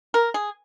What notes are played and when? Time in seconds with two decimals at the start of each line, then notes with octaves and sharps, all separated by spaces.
0.14 A#4
0.34 G#4